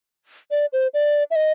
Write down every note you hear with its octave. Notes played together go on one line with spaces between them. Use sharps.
D5
C5
D5
E5
D#5